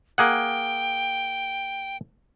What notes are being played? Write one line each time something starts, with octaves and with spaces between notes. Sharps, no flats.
A#3 G#4 F#5 G5